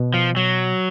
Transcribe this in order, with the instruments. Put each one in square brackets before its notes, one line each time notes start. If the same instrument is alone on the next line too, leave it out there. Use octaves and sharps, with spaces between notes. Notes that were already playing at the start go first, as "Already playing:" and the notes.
Already playing: [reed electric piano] B2
[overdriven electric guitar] F3
F#3